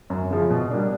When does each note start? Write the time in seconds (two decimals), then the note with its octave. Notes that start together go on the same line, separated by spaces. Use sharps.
0.10 F#2
0.30 C#3 F3
0.50 B2
0.70 G3 A#3 D4